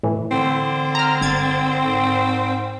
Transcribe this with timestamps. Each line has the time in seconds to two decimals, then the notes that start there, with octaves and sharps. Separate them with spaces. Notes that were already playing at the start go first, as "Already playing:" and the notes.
0.03 A2 E3
0.32 D3 C4
0.95 A#5 F6
1.21 G1 G#6 A6
1.86 G#2